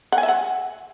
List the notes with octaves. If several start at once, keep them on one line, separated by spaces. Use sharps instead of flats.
F#5
G#5
E5
F#5